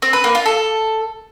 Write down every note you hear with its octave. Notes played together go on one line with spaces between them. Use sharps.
C4
B4
A#3
F4
A4